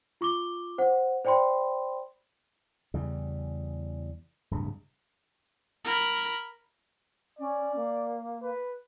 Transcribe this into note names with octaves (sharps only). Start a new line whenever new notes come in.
F4 C#6 D6 G7
C5 F#5
C5 D5 G5 B5 C6
E2 C#3 G3
D1 G2 C#3
A#4 B5
C#4 D5
A#3
B4